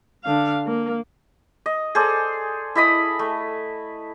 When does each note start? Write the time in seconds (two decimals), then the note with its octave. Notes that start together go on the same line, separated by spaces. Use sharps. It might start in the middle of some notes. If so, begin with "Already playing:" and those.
0.24 D3 F5
0.66 A#3
1.66 D#5
1.95 G#4 A4 C5 D5
2.75 E4 D#5 B5 D#6
3.19 A3